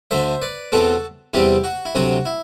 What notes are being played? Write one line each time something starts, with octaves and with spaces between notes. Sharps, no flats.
D2 D3 A3 C5 E5
B4 D5
E2 B2 A3 C4 F#4 A4
E2 C3 G3 C4 E4 G4
F#4
E4
D2 C3 F#3 C4 F#4
E4